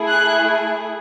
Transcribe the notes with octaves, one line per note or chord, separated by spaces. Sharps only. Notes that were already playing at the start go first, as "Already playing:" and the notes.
Already playing: A3 E4 G#4
F#6